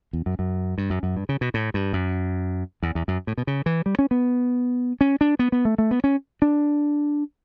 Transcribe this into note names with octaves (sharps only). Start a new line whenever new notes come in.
E2
F#2
F#2
G2
F#2
F#2
G2
C#3
B2
A2
G2
F#2
E2
E2
F#2
A2
B2
C#3
E3
G3
C#4
B3
C#4
D4
B3
B3
A3
A3
B3
C#4
D4